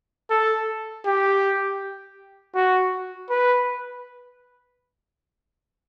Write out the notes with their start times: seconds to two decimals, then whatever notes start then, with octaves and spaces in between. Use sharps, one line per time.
0.30 A4
1.06 G4
2.55 F#4
3.30 B4